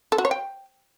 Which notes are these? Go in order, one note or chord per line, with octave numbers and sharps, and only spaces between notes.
A4
F#4
C#5
G5